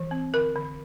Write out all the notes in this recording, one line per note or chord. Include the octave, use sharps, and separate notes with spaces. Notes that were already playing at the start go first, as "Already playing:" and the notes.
Already playing: E3
C4
D3 A#4
D3